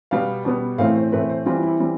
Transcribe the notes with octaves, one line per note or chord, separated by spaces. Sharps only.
B2 G3 B3 F5
B2 G3 B3
A2 E3 A3 C4 F5
C5
A2 E3 A3 C4 B4
C5
E3 G3 C4 F4
E4
E3 G3 C4